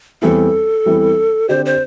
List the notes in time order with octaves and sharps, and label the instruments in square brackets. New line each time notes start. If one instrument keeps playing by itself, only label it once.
[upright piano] E2 E3 G3 C4 E4 [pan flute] A4
[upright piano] E2 E3 G3 C4 E4
[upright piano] D3 C4 G4 D5 [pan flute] C5
[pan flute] C5